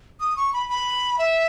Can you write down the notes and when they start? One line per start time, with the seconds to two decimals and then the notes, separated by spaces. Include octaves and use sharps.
0.20 D#6
0.36 C#6
0.53 B5
0.69 B5
1.18 E5